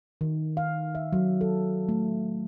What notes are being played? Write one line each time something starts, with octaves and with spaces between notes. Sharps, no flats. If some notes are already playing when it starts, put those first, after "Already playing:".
D#3
F5
E5
F#3
A4
A3